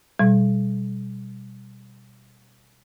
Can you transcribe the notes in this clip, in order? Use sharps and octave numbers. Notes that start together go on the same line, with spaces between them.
B2 G3